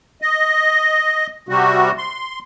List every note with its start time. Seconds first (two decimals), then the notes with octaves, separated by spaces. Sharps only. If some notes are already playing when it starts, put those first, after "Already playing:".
0.22 D#5
1.49 C3 G3 F#4
1.98 C6